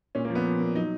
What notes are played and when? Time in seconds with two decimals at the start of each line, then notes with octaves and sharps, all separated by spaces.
0.15 A#2 C#4
0.25 A#3
0.30 F3
0.35 B3
0.45 F3
0.61 A#2
0.75 F#3 D#4